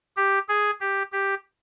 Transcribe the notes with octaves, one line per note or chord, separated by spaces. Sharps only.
G4
G#4
G4
G4